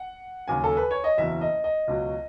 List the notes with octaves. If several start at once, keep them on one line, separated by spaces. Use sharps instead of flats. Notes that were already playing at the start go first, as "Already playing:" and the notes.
Already playing: F#5
D#2 C#3 F#3 G#5
A4
B4
C#5
D#5
F#1 E2 B2 E5
D#5
D#5
C#2 B2 F#3